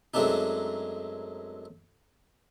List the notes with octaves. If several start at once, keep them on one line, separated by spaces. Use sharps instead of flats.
F#2 G#3 A3 C4 D4 D#4